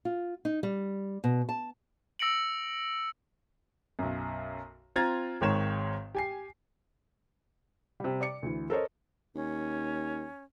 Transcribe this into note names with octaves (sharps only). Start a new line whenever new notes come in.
F4
D#4
G3
B2
A5
E6 A#6 C#7 D7 F#7
B1 F#2
C4 F4 A#5 G#6 A6
G#1 G#2 D#3 C#5 E7
G4 G#5 C7
C3 G3
D5 D6 C#7
D2 E3
A4 A#4 C5 C#5 D#5
D#2 C#4